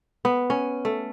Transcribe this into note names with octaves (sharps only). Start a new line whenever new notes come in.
B3
C#4
A3